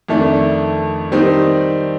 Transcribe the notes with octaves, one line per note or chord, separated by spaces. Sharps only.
F2 D#3 A3 D4
D#3 G3 C4 D#4